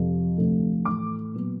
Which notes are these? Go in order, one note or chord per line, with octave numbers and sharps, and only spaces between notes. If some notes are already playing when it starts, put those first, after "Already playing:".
Already playing: F2 C3 F3
D2 C3 F3 A3
A2 E3 A3 D6
A#2 F#3 B3